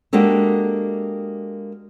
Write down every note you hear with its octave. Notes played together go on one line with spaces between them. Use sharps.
G#3 A#3 D4 F#4 G4 A4